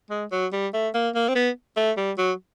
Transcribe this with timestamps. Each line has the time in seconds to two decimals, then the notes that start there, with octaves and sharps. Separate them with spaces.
0.10 G#3
0.32 F#3
0.53 G3
0.74 A3
0.94 A#3
1.15 A#3
1.29 C4
1.35 B3
1.76 A3
1.97 G3
2.18 F#3